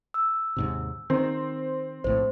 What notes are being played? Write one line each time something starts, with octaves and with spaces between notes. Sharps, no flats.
E6
D#2 G#2 C3
D#3 C4
A#1 A2 A3 C5